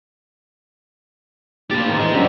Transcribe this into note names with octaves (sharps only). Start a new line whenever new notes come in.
A2 A#3 D4 G4 A6
D#3 C4
E3 G#3 G#4 D#5
F#2 D3 F#3 C4 C#4 G4 D5